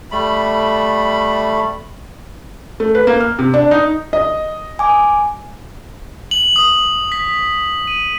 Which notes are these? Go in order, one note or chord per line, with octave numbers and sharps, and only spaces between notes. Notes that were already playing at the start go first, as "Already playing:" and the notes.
G3 A3 B5
A3
B4
A#3
F6
C3
D4
D#4
D#5
G#5 D6
F#7
D#6
B6
D#7